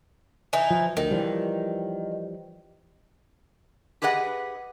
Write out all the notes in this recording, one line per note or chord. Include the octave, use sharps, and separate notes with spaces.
E3 D#4
F3
D2 D#3
E3 F3 G3
G4 G#4 B4 D#5 F#5